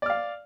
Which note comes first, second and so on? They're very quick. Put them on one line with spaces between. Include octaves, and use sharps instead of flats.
D5 F6 F5